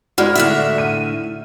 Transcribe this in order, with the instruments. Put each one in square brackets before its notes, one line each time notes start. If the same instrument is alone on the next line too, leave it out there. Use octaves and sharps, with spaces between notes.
[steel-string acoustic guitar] G#3 E4 [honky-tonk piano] F#4 D5 F6
[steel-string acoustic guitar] A2 D3 E5
[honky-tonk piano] D#7